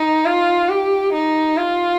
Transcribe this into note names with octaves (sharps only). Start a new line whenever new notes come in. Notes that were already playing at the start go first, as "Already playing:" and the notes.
Already playing: D#4
F4
G4
D#4
F4